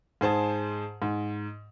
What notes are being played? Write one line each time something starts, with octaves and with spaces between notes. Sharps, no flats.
G#2 G#4 C5 A5
G#2